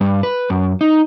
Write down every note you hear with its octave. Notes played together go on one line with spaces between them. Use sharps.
G2
B4
F#2
D#4